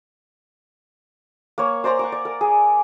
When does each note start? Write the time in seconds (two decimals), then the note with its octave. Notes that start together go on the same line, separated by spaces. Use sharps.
1.58 A#3 C#5
1.84 C5 D5 A#5 C6
1.99 F#5 C#6 D6
2.12 D5
2.25 A#4
2.41 G#4